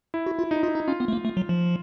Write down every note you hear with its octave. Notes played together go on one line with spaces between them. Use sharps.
E4
F#4
F4
D#4 E4
D#4 F4
D#4
C#4 F4
B3
A3
A#3
A3
F#3
F3